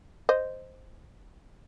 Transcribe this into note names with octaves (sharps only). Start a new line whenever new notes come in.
C5 D#5